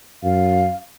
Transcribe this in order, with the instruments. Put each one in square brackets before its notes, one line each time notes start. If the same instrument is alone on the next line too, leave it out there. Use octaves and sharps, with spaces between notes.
[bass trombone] F#2 [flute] F5